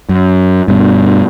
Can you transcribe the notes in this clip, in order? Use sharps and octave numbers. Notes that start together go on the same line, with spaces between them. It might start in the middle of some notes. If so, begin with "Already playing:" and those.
F#2
G2 B2